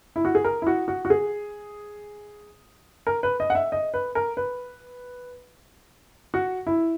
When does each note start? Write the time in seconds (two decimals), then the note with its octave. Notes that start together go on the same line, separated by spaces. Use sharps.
0.16 E4
0.25 F#4
0.35 G#4
0.44 A#4
0.62 E4
0.67 F#4
0.88 F#4
1.05 F#4
1.10 G#4
3.07 A#4
3.23 B4
3.40 D#5
3.50 F#5
3.55 E5
3.72 D#5
3.94 B4
4.15 A#4
4.37 B4
6.34 F#4
6.67 E4